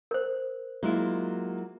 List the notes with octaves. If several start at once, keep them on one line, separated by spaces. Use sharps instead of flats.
A#4 C5
F#3 G#3 A#3 E4 F4